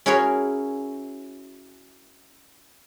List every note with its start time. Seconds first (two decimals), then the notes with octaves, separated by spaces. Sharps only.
0.06 C#4 E4 F#4 G#4 A#4 C#5